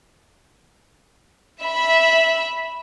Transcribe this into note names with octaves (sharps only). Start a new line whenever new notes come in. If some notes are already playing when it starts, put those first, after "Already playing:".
E5 B5